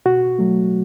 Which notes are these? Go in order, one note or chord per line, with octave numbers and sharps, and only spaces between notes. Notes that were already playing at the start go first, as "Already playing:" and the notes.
B2 F#4
F#3 A3